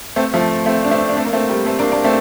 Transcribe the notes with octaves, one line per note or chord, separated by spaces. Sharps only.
A3 C4
F3 A3
A3 C4
D4
A3 C4
D4
A3 C4
A#3
A3 C4
G3 A#3
A3 C4
A#3 D4
A#3 D4
A3 C4